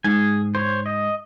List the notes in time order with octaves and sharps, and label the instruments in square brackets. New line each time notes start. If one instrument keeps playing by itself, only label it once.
[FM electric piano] G#2 [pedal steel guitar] G#4 G#5
[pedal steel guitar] C5 C#5
D#5